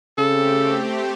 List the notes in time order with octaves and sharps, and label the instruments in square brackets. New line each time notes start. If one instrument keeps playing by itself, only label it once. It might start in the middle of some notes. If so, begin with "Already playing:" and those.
[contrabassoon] C#3 [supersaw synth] A3 C4 G4 [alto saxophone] A4